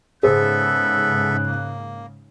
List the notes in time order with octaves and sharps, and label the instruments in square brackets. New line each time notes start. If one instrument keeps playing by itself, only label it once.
[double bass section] G#2 C#3 [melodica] B3 A4 E5 [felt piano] G#4 C5 [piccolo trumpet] F#6
[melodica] A#3